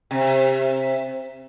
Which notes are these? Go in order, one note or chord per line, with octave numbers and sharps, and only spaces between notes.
C3